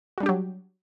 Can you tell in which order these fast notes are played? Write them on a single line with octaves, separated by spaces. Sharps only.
F#4 G3 D4 G4 F#3